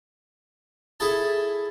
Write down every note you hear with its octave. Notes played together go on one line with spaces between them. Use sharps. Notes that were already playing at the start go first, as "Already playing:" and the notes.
E4 G#4 A4 A5